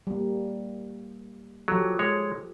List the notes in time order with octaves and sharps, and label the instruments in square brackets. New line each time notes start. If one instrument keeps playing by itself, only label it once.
[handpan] G3 A#3
[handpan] F3 G4 A4 [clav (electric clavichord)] F#3
[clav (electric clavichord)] G#3 C#5